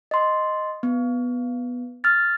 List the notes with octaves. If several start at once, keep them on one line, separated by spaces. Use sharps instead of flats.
D#5 C6
B3
F6 A6